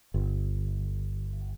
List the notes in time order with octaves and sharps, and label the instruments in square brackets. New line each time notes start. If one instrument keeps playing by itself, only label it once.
[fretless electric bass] G1